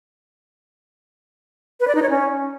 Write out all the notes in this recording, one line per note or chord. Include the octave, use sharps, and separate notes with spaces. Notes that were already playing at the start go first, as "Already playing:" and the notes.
B4
D5
D#4
C#5
C#4